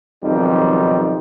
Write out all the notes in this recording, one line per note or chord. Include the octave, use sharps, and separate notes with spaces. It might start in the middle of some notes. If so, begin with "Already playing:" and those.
B1 F2 D#3 G3 D#4